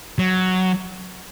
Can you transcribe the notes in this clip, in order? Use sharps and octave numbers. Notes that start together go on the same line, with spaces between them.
F#3